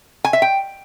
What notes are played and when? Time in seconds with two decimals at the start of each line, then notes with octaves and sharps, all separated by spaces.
0.24 G#5
0.33 E5
0.42 G5